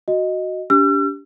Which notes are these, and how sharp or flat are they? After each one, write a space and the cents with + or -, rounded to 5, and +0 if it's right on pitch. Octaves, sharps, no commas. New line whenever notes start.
F#4 +0 D#5 +0
D4 -40 G4 +0 E6 +45